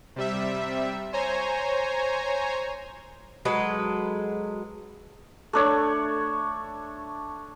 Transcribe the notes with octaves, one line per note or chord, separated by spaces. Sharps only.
C3 G3 E5
C5 C#5 G#5 A#5
F#3 G#3 A4 B4
A3 D4 C#5